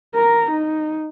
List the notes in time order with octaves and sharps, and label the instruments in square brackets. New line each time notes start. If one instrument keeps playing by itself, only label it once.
[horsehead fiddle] A#4 A#5
D#4